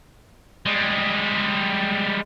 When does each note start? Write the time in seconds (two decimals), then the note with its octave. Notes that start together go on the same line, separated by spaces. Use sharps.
0.66 G3 G#3